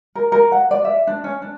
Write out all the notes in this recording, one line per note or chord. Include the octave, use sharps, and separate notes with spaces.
A#4
A#4
F#5
D5
E5
D4
C#4
D4